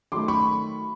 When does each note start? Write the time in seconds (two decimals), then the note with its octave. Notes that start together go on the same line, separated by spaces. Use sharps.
0.12 D#3 F#3 A3 C6 D6
0.28 B5 C#6